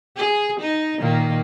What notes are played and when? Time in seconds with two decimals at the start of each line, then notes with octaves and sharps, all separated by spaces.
0.17 G#4
0.60 D#4
1.00 A#2 D#3 A#3